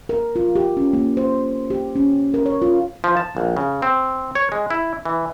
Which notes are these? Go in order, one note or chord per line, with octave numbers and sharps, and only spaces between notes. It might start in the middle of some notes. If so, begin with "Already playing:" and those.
A#4
F4
G4
C#4
A#3
C5
G4
C#4
A#4
C#5
F4
F3
A5
A#1
C#3
C4
C#5
G#3
E4
E3